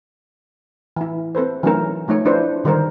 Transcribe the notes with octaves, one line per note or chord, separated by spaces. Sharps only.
E3 E4
C4 A4 B4 C5
E3 F#3 A3 C#4 D#4 A#4
F3 A3 D#4 C#5
F3 D4 E4 B4 C5
D3 D#3 G3 D#4 A#4 C5